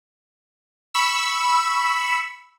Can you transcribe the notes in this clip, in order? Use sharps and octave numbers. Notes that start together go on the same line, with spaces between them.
B5 C#6 E6